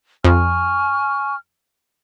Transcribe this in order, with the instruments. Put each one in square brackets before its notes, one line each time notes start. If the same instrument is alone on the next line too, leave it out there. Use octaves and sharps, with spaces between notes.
[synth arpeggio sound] F2 [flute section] G#5 C#6 F6